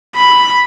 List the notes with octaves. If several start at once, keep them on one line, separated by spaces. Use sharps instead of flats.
B5